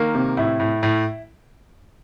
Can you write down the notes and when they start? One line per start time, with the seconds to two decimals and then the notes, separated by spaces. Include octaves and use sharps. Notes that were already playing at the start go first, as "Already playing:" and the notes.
Already playing: D#3 A#3
0.15 C3
0.37 A2 E4
0.60 A2
0.83 A2